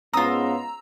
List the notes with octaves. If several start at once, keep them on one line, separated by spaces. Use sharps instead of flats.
G#2 B3 C#4 F4 A#5 D#6 E6